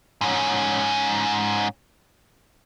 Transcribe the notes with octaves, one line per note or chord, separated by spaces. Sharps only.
G#2 C#4